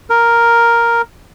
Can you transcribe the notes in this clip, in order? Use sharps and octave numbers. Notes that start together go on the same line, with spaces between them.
A#4